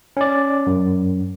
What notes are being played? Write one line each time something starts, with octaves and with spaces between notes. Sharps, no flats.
C#4 D5
F#2